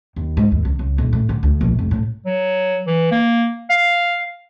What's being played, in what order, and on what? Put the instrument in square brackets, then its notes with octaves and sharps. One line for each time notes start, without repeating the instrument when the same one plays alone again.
[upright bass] D#2
G#2
D#2
C#2
C#2
D#1
A2
D3
D2
A#1
F1
A2
[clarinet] F#3
E3
A#3
F5